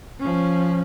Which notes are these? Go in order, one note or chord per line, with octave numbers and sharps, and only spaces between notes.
F3 C#4